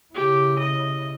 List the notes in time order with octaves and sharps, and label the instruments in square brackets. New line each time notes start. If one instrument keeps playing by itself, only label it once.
[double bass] C#3 E4 [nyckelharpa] G4
[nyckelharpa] D#5